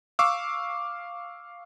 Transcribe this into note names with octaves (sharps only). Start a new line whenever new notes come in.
F5 C#6 D6 E6